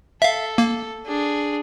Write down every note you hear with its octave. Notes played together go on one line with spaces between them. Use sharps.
A4 E5 F5
A#3
D4 G#4